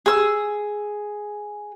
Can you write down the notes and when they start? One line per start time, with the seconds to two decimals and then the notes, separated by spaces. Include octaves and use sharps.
0.06 G#4 E6